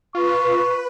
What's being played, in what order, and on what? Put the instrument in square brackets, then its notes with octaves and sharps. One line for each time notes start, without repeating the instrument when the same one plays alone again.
[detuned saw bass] F4 [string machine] B4 [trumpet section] C#6